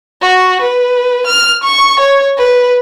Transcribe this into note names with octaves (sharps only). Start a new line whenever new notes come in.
F#4
B4
F6
C#6
C#5
B4